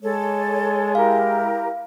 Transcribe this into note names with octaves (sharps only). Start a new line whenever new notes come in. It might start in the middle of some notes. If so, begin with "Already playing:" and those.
G#3 A4 C#5
E4 G4 A#4 F5